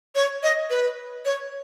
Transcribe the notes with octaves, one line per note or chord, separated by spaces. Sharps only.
C#5
D#5
B4
C#5